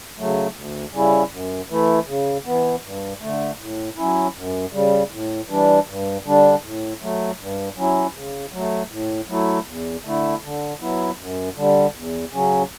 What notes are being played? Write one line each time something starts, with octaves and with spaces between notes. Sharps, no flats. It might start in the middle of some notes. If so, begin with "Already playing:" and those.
C#3 F#3 A3
D2
C#3 G3 C#4 E4
F#2
E3 A3 E4
C#3
E3 B3
G2
D3 A3
A2
F#3 C#4 E4
F#2
C#3 G3
A2
E3 G3 D4
G2
D3 G3 D4
A2
F#3 A3
G2
F#3 C#4 E4
C#3
F#3 A3
A2
F#3 A3 E4
E2
D3 A3 E4
D3
F#3 B3 E4
F#2
D3 G3
E2
C#3 F#3 C#4